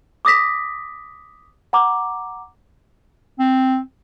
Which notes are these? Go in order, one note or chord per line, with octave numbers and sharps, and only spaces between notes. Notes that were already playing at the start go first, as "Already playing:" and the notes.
D6 D#6 A#6 B6
F#5 A#5 D6
C4